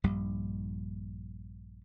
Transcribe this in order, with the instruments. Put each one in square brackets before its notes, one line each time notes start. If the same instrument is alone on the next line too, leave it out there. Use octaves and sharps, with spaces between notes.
[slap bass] A#1 G2 G3